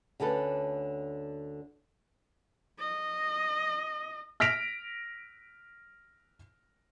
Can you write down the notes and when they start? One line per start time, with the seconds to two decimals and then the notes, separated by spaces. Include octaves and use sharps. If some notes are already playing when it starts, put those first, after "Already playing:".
0.20 D2 D3 C#4 A4 B4
2.79 D#5
4.40 F6 A#6 B6 D7 F7